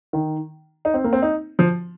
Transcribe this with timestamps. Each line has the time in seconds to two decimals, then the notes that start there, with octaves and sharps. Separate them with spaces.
0.13 D#3
0.85 D#4
0.94 C4
1.04 A#3
1.13 C4
1.22 D#4
1.59 F3